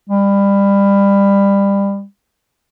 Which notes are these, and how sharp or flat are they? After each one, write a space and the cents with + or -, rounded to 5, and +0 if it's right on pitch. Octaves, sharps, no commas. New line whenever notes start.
G3 +25